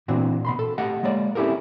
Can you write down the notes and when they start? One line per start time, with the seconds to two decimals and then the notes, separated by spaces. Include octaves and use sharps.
0.08 A#2 E3 C4 D4 F#4
0.45 B2 B5 C6
0.59 A4
0.78 A3 G4 D#5 F#5
1.03 G#3 A#3 C#5 D5
1.35 C4 C#4 E4 G4 A4 A#4